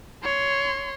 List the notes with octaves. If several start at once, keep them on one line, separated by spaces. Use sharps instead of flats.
C#5 C6